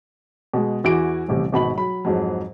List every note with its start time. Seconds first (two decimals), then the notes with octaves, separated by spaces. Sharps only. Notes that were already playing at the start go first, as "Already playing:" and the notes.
0.54 B2 G#3
0.84 E2 E4 F#4 G#5 D6 D7
1.28 D#1 A1 C3
1.52 G#1 B2 B5 F#7
1.75 F#3 B5
2.05 F2 G#2 F#3